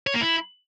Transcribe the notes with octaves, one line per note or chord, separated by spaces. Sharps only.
C#5
A#3
E4